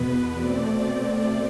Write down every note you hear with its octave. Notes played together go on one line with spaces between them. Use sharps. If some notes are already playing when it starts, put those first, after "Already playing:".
Already playing: E2 B2 B3 B4
B2 A3 C4 D5
B2 A3 C4